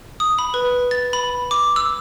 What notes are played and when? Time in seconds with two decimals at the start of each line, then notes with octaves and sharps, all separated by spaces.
0.20 D#6
0.39 B5
0.54 B4
0.91 A6
1.13 B5
1.51 D6
1.76 E6